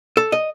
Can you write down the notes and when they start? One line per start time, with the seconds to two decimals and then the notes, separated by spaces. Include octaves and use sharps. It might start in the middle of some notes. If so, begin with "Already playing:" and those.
0.17 A4
0.32 D#5